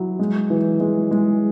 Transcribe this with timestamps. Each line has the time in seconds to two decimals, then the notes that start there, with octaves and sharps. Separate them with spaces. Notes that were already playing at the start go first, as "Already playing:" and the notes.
Already playing: F#3 E4
0.19 G#3
0.50 E3
0.80 G#3
1.11 G#3